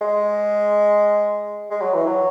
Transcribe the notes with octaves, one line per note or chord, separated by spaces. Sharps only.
G#3
G#3
F#3
E3
F#3